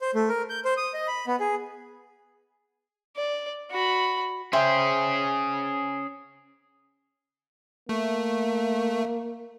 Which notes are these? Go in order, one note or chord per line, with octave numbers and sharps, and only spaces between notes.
C5
A3
A#4
G6
C5
D#6
D#5
B5
B3
G#4
D5
F#4 B5
C#4 G#4 C5 E5 G5
A3 A#3